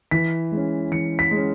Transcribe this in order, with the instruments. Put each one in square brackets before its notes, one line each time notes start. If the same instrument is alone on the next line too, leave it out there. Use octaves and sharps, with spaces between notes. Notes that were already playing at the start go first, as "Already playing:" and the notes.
[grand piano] E3 B6
G#3 C#4
E3 C#7
B6
G#3
C#4